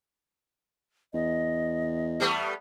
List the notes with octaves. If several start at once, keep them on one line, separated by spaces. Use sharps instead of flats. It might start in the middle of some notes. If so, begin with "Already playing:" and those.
E2 D#5
G3 A3 B3